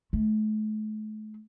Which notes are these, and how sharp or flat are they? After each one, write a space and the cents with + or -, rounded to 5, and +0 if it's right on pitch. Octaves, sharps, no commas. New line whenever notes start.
A3 -40